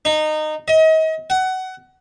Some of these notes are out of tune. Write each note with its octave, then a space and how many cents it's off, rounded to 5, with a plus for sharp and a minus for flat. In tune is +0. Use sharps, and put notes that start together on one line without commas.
D#4 -20
D#5 +35
F#5 +20